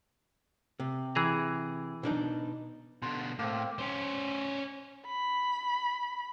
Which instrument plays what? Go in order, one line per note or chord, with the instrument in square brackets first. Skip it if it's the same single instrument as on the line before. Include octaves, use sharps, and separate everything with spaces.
[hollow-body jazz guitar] C3
[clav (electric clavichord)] E3 G#4 A#5
[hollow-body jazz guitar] B2 D4 D#4
[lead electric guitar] B2 D3 [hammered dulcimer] C6
[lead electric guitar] A2 [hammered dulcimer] A#3 C4
[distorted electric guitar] C#4 C5
[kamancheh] B5